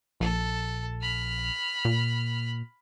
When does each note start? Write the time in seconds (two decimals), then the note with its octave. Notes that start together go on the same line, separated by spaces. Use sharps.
0.20 A#1 A4
1.01 B5 F6
1.85 A#2